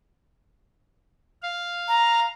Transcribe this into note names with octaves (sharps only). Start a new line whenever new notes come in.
F5
A#5